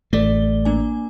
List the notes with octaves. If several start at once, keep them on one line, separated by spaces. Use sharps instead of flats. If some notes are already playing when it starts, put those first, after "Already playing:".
A1 A3 D5 G7
A#3 D4 G#5